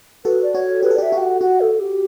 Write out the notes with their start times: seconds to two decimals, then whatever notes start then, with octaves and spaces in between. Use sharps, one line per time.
0.25 F#4 A4 B4
0.43 D5
0.55 F#4 C#5
0.83 G4 B4
0.91 A4
0.96 D5
0.98 G4 E5
1.12 F#4
1.17 G5
1.22 F#5
1.41 F#4 F#5
1.61 A4
1.80 G4